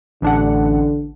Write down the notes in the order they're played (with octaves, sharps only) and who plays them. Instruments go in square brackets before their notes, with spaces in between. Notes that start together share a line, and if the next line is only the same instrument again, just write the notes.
[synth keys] A1 D4 F#5 [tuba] D3